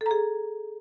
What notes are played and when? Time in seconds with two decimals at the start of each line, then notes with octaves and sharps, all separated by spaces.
0.01 A4
0.06 A#5
0.11 G#4